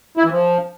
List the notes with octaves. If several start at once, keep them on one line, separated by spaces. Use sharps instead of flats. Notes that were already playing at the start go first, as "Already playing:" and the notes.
E4
E3
F3